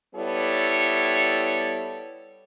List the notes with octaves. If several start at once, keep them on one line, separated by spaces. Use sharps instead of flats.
G3 B3 E4 A4 C#5